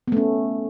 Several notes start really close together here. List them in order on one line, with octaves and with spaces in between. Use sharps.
B3 A3 C#4